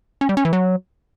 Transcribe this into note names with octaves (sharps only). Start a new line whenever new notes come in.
C#4
G3
C#4
E3
F#3